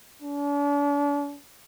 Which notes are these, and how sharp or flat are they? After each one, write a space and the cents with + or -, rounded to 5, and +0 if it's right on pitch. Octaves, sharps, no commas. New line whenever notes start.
D4 -40